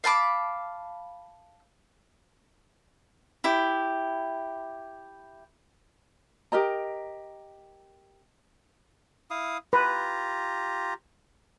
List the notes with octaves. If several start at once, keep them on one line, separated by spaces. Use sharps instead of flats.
F5 A5 B5 D6
E4 G4
G4 A#4 D#5 A#5
E4 F5 D#6
F4 G4 B4 A#5